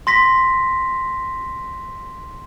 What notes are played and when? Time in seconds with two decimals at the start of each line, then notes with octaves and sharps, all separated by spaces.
0.07 C6 A#6 B6